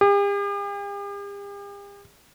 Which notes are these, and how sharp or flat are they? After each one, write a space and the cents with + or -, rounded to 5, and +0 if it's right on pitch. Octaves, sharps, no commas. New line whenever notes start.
G4 +45